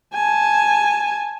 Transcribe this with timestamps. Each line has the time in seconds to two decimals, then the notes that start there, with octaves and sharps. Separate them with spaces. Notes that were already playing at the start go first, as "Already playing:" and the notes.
0.14 G#5 A5